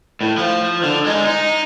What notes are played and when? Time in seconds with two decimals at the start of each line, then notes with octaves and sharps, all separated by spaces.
0.21 A2
0.37 F3
0.83 D3
1.06 G#3 D#4
1.26 D#4